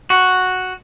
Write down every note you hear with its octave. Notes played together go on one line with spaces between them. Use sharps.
F#4